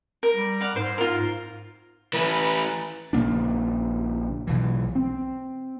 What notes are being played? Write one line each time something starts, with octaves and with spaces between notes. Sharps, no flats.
A#4
G3
D5 F5 F#5
G#2 C5
F4 A#4
E3 A3 B4
A#1 C#3 A#3 D4
B1 E3
C4